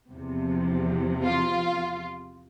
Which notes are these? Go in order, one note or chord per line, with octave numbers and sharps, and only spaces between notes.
E2 C3 F3
F4